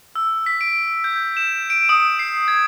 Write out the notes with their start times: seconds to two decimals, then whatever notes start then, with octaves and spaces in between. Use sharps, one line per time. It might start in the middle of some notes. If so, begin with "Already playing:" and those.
0.16 E6
0.46 B6
0.61 D7
1.04 G6
1.37 E7
1.70 D7
1.89 D#6
2.19 C7
2.48 G#6